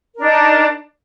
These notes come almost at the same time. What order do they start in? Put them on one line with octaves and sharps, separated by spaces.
A#4 D4 D#4